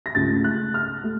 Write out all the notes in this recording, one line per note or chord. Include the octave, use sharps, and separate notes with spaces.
A#6
C#2 C#3 A3 A6
F#6
F6
A3